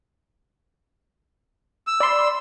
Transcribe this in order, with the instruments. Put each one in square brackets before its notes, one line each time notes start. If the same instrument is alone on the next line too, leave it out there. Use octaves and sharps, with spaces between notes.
[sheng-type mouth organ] E6
[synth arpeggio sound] D5 B5 C6